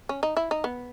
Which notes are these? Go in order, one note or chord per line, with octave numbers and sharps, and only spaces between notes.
C#4
D#4
E4
D#4
B3